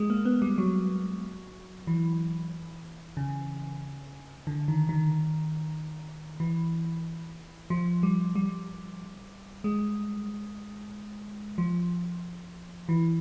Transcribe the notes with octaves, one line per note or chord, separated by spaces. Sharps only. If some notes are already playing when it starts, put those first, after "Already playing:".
Already playing: G#3
A#3
B3
G3
F#3
E3
C#3
D3
D#3
D#3
E3
F3
G3
G3
G#3
F3
E3